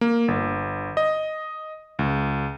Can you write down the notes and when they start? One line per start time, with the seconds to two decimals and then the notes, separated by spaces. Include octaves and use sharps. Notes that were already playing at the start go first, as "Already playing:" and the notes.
0.01 A#3
0.28 G1
0.97 D#5
1.99 C#2